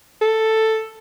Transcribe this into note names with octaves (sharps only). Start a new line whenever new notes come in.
A4